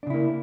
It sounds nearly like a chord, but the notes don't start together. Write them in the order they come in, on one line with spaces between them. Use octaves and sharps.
D4 C#3 E4 A#3